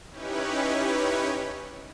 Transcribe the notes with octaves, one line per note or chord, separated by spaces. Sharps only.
C#4 D#4 E4 G4 B4 C#5